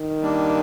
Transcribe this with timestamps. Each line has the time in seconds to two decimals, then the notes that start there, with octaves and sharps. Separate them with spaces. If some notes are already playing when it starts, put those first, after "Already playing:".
Already playing: D#3
0.21 G3 A#3 D4